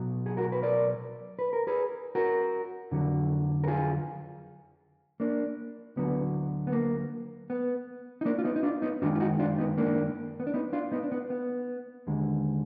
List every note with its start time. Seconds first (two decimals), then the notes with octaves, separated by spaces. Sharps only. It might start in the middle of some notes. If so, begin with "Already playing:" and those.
Already playing: B1 B2 F#3
0.26 G#4
0.37 F#4 A#4
0.52 B4
0.62 A#4 D5
1.39 B4
1.53 A#4
1.67 G#4 B4
2.15 F#4 A#4
2.91 F2 D3 F#3
3.64 A#4
3.67 F4 G#4
5.20 A#3 D4
5.96 D2 D3 F#3 B3
6.67 B3
6.72 A#3
7.50 B3
8.21 D#4
8.25 A#3 D4
8.39 F4
8.45 B3 D#4
8.56 D#4
8.63 D4 F4
8.82 B3 D#4
9.02 F#2 D#3 G#3 D4 F4
9.15 F4
9.20 D#4 F#4
9.39 D4 F4
9.58 B3 D#4
9.78 A#3 D4
10.40 B3
10.47 D4
10.54 B3 D#4
10.73 D4 F4
10.92 B3 D#4
11.03 D4
11.12 B3
11.30 B3
12.07 D#2 D3 G#3